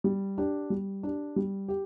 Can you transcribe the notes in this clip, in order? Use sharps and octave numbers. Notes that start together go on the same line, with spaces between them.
G3
D4 G4
G3
D4 G4
G3
G4